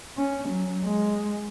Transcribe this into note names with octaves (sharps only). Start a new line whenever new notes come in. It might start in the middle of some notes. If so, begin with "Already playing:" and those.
C#4
F#3
G#3